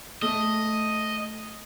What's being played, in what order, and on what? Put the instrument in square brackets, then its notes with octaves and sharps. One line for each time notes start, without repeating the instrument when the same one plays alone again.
[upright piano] A3 [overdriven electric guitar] D#5